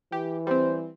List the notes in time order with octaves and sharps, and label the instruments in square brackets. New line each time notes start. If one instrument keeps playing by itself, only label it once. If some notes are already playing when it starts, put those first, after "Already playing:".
[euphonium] E3 [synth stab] G4
[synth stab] G3 C4 [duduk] C5